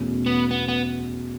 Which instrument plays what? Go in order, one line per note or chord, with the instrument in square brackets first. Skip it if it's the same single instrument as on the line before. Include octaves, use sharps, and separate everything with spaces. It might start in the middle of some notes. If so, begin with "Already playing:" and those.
Already playing: [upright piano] E2 B2 A3 C#4 E4
[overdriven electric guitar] B3
B3
B3